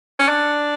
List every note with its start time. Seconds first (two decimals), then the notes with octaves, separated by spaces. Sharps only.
0.19 C#4
0.28 D4